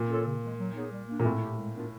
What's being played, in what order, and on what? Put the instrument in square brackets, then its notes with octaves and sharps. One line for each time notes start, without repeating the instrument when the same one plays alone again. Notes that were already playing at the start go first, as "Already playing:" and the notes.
Already playing: [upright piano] A#2
[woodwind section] C#4 F4 A4 C#5
C#3
E3 G#3
F#3
B3 D#4 G#4 C#5
G3
A#3 D4
[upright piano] A#2
[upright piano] A2 [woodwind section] C4
[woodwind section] E4 G4
G#3
B3 D4 F4 A#4